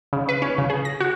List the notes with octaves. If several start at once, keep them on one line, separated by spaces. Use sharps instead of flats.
C#3
B4
C#4
C#3
G#4
A#6
F#4